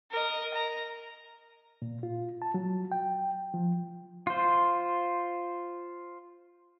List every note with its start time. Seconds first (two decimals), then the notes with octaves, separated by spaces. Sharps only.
0.11 A#4 D#5
0.54 A#5
1.82 A#2
2.03 F4
2.42 A5
2.54 F#3
2.92 G5
3.54 F3
4.27 F4 C5